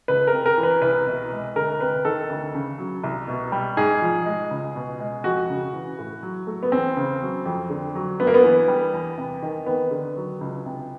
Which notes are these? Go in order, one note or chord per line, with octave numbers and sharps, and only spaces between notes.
C#2 B4
A#4
C3
A#4
E3
B4
C2 B4
B2
G#3
D2 A#4
C3 B4
D#3 A4
D2
C#3
F#3
C2
B2
G3
G#2 G#4
F3
G#3
C#2
B2
G#3
F2 F#4
C#3
E3
A2
F#3
A3
B3
E2 C4
C#3
F#3
F2
D3
F#3
G2 B3
A#3
B3
E3
G3
E2
C3
D#3
D#2 B3
D3
F#3
C#2
C3